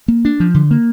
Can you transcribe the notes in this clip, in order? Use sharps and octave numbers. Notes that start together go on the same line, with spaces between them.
A#3
D4
F3
D3
A#3